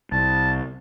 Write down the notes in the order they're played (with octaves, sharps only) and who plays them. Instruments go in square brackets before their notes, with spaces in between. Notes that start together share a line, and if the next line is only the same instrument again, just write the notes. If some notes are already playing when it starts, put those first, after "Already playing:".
[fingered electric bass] C2 [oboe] A5